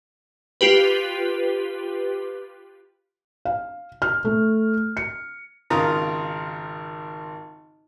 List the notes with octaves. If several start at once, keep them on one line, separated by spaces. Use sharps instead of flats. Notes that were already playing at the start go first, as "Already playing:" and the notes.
F4 G4 B4
F5
F6
A3
C#7
G#1 C#3 F4 A#4 A#5 D#6